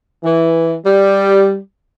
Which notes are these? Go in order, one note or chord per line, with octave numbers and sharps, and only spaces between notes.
E3
G3